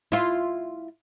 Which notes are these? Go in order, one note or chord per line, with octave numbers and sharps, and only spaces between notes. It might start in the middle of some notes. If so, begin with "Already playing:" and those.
E4 F4